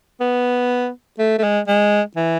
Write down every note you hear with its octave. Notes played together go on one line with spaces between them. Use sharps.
B3
A3
A3
G#3
G#3
E3